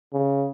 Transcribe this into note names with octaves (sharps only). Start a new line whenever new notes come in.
C#3